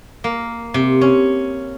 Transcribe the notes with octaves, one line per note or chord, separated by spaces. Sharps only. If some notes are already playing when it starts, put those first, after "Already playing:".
A#3
C3
C#4